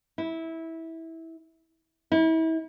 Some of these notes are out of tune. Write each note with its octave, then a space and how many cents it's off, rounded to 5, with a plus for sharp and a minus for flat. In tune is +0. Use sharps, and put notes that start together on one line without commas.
E4 -15
E4 -35